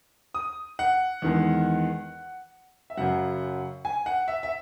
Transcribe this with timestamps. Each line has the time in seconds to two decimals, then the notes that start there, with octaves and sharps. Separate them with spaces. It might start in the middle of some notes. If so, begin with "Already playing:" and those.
0.35 D#6
0.79 F#5
1.22 E2 D#3 G#3
2.90 E5
2.97 F#2 C#3 F#3 F#5
3.85 G#5
4.06 F#5
4.28 E5
4.43 E5